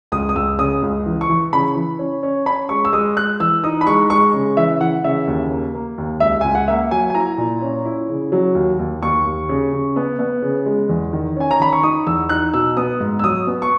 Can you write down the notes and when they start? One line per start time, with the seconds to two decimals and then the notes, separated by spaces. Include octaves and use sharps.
0.12 C#2 D#6
0.29 D#6
0.35 C#2 E6
0.58 C#3 D#6
0.82 C#2
1.06 E3
1.21 C#6
1.29 E3
1.53 C#3 B5
1.76 E3
1.99 C#4
2.23 C#4
2.46 C#4 B5
2.69 G#3 C#6
2.85 E6
2.93 G#3 D#6
3.17 G#3 F#6
3.40 E3 E6
3.64 D#4 D#6
3.81 B5
3.86 G#3 C#6
4.10 G#3 C#6
4.34 C#3
4.57 E3 E5
4.81 E3 F#5
5.04 C#3 E5
5.27 D#2
5.51 A#3
5.74 A#3
5.98 D#2
6.20 C#2 E5
6.41 C#2 G#5
6.55 F#5
6.68 A#3 E5
6.91 F#3 G#5
7.10 G#5
7.14 E4 A#5
7.38 A#2
7.62 C#4
7.85 E4
8.09 C#3
8.32 F#3
8.55 D#2
8.79 D#2
9.02 D#2 C#6
9.25 D#2
9.49 C#3
9.72 C#3
9.96 B3
10.19 B3
10.42 C#3
10.66 G#3
10.89 E2
11.13 D#3
11.36 C#4 G#5
11.51 A#5
11.60 D#3 B5
11.73 C#6
11.83 D#4 D#6
12.07 E2 E6
12.29 D#4 F#6
12.54 B2 E6
12.77 B3 D#6
13.00 G#2
13.19 E6
13.24 F#3 D#6
13.47 B3
13.62 C#6